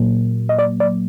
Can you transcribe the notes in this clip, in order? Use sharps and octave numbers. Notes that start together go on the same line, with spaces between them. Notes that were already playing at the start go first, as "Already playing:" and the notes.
Already playing: A#2 F#3 A#3
D#5
D5
D5